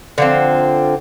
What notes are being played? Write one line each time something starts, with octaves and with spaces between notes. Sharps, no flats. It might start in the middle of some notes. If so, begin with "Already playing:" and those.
D3 F3 C4